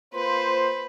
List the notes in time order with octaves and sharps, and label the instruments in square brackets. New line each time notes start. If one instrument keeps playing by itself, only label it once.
[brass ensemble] A#3 F4 C5 [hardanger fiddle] B4